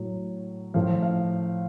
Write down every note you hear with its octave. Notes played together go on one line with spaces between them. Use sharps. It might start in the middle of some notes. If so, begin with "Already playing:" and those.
Already playing: A2 F#3
A2 F3 F5
F5